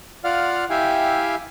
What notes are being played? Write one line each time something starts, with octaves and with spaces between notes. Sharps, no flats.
F4 D5 F5 F#5 F6
E4 G4 E5 F5 G5 G#5